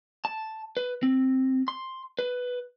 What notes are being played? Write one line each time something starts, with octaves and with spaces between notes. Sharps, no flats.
A5
B4
C4
C6
B4